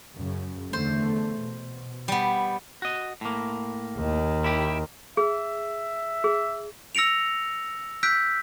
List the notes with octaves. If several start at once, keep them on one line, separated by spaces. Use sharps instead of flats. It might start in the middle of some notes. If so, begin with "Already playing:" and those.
F#2 C#3
E2 D3 A3 C5
B2
G3 B3
F#4 D#5
A2 A#3
D#2 D#3
E4 G4
G#4 E5
G#4
E6 A#6 C#7 D7 F7
E6 F#6 G6 B6 D7